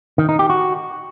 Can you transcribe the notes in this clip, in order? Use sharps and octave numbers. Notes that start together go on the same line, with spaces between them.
D#3
D#4
G4
F#4